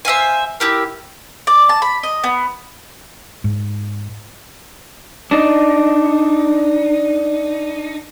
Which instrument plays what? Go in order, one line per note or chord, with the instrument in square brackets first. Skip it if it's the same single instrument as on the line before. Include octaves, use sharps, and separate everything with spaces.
[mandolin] C5 E5 F5 G#5
E4 G4 A#4
D5
A5
B5
D#5
B3
[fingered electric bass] G#2
[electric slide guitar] D4 D#4